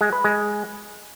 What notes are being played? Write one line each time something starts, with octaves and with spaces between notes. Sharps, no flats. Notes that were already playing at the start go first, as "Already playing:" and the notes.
G#3
B4
G#3